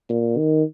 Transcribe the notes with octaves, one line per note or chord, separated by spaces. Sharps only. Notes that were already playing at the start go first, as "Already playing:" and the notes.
A#2
D#3